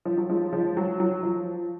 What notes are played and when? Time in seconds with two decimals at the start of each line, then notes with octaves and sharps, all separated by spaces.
0.05 F3
0.17 F#3
0.30 F3 G#3
0.53 F3 G#3
0.77 F#3
1.00 F#3
1.23 F3